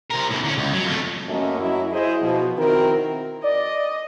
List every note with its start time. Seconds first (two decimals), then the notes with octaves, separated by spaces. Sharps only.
0.11 C3 A#4
0.31 E2 A2
0.44 D3 C#4
0.58 C#2
0.73 F#3
0.86 F2 A3
1.28 F#2 A3 A#3 C#4 A4 D#5
1.60 F#2 F#3 E4
1.91 E4 G#4 C5 D#5
2.22 B2 F3
2.58 D#3 C4 E4 F#4 A#4
3.44 D5 D#5